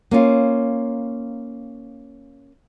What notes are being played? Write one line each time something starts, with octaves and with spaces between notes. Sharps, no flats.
A#3 C#4 F4